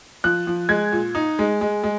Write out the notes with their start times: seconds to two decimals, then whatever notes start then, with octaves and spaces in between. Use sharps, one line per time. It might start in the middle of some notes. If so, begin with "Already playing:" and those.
0.24 F3 F#6
0.47 F3
0.69 G#3 G#6
0.92 A#2
1.15 D#4
1.39 G#3
1.61 G#3
1.84 G#3